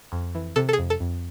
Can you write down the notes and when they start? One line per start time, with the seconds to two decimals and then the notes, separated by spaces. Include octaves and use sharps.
0.12 F2
0.35 E3
0.56 C3 A4
0.69 A4
0.73 G#4
0.79 F2
0.90 A4
1.00 F2